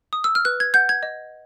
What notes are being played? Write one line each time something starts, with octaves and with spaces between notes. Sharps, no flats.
D#6
E6
F6
B4 F#6
G#6
F#5 G6
G#6
D#5